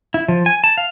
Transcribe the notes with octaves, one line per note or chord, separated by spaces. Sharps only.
E4
F3
G#5
A5
F5